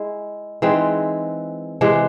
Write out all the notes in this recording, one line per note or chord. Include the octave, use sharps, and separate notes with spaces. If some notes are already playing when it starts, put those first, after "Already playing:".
Already playing: G#3 E4
E3 G#3 C4 D#4
C3 E3 G#3